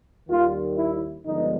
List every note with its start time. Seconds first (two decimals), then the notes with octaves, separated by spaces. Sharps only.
0.29 D#2 D#3 G3 F4
0.77 E4
1.26 G2 D3 F3 G#3 B3 D#4